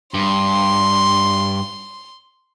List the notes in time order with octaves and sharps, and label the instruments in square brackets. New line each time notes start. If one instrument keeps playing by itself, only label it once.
[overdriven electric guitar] G2 [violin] C6